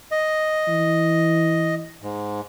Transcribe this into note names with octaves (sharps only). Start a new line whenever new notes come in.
D#5
E3
G#2